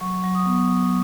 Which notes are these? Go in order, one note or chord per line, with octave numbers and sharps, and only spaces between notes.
F#3 C#6
F#3
D#6
B3
F#3